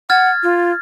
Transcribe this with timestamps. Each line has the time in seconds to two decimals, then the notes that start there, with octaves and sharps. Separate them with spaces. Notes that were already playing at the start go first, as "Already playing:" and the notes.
0.10 F#5 F6 G#6 A6
0.43 F4